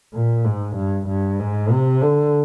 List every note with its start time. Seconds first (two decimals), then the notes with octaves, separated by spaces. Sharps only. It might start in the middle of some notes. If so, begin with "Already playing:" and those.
0.14 A#2
0.45 G#2
0.76 G2
1.07 G2
1.40 G#2
1.71 C3
2.02 D3